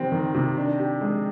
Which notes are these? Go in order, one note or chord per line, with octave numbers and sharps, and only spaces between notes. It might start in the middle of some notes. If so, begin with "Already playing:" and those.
Already playing: C3 D#3 G3 C4
D#3
C3
D4
G4
G#3